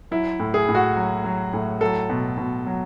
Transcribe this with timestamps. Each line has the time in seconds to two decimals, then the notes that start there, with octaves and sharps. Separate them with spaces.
0.11 F#3 E4
0.40 A2
0.54 G#4
0.69 A2
0.75 F#4
0.96 F#3
1.24 F#3
1.53 A2
1.81 F#3 A4
2.09 B2
2.38 B2
2.67 F#3